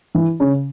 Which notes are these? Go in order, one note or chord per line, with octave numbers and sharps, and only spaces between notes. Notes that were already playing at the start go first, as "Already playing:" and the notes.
E3
C#3